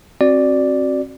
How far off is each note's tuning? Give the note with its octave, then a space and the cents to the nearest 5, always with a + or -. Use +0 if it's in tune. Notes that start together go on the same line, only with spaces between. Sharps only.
C4 +30 F#4 +0 D5 +0